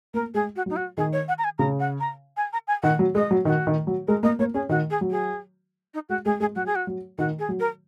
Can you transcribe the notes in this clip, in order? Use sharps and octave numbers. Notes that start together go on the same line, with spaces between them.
A#3 A#4
G#3 G#4
F#4
F#3 D#4
F#4
D#3 G#4
C#5
F#5
A#5
G#5
C#3 A#5
F#5
A#5
G#5
A#5
G#5
D#3 F#5
F#3
G#3 D#5
F#3
D#3 F#4
D#3
F#3
G#3 A#4
A#3 D#5
A#3 C#5
C#4 G#4
D#3 F#4
G#4
F#3
G#4
D#4
G#3 F#4
G#3 G#4
G#3 G#4
F#3 F#4
G#4
F#4
F#3
D#3 F#4
G#4
F#3
A#4